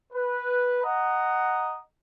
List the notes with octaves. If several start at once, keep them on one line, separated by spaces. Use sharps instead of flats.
B4
D#5 F#5 A#5